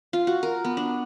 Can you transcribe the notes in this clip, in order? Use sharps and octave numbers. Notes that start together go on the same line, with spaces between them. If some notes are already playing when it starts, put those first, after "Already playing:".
F4
F#4
A#4
B3
D4